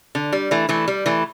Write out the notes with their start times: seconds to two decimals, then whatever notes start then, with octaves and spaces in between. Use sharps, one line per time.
0.15 D3
0.33 G3
0.51 E3 A3
0.69 E3 A3
0.88 G3
1.06 E3 A3